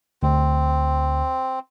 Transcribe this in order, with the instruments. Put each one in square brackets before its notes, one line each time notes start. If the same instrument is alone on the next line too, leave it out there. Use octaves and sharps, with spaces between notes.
[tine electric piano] D2 [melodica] C4